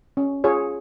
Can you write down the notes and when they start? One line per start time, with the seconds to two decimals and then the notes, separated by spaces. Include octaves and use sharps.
0.17 C#4
0.44 F4 G#4 C#5